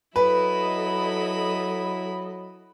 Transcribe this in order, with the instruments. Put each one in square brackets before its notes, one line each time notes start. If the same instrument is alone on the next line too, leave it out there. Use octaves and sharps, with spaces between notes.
[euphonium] F#3 [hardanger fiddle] E4 B5 [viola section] A4 D#5 [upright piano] B4